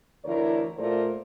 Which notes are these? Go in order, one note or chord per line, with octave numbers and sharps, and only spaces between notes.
D2 E3 E4 A#4 C#5 D5
A#2 A3 F4 A#4 C5 D5